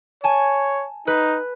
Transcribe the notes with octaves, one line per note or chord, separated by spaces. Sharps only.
C#5 G#5 A5
D#4 B4